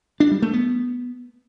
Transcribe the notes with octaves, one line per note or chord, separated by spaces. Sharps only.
D4
G3
A3
B3